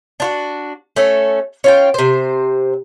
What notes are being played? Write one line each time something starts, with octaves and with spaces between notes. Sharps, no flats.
D4 F4 F#4
A3 C#4 A4
C#4 F4 G5
C3 C5